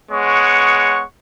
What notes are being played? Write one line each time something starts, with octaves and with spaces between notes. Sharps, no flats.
G#3 B3 C#5 F#5 C#6